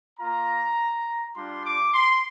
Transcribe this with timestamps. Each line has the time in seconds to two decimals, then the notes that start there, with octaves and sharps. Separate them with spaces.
0.20 A#3 F4 A#5
1.36 G3 D4 F4 C6
1.66 D6
1.94 C6